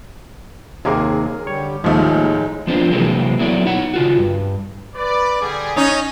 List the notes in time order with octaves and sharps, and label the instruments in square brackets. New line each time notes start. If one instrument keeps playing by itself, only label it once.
[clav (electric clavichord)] D#2 C3 A#3 [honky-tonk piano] G#4 [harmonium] A#4
[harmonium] D3 G3 G4 [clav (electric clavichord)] C#5
[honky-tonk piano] D#2 D#3 [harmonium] A2 G#3 D#4 [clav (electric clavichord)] F3 A3
[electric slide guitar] F3 B3 C4 D4 F4
C3 E3 F#3 G#3 A#3 C4
F#3 A3 B3 E4 D5
D#4 C#5 F#5
C#3 F4 F#4
G2
[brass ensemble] B4 D5
D3 G3 G#4
[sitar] C#4 D#4 [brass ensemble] D#5